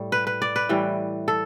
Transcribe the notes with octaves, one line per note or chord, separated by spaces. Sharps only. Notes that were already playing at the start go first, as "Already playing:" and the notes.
Already playing: A2 G3
B4
B4
D5
B4
A2 E3 G3
A4